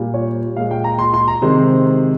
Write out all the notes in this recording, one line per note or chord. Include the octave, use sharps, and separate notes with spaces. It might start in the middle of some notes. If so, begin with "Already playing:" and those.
Already playing: A#2 G3
C#5
A#2 G#3 F5
G5
A#5
C6
C6
A#5
C3 D#3 G#3 C5